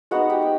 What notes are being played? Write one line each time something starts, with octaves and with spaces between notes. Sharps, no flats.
G#3 B3 D#4 F#4 F#5
G4 G5
G5